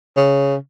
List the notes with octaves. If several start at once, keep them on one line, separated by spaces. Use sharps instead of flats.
C#3